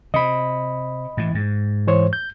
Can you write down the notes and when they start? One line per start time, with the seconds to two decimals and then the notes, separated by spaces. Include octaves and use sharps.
0.14 C3 D#5 B5
1.17 A2 E3
1.35 G#2
1.87 E3 C5 C#5
2.13 G6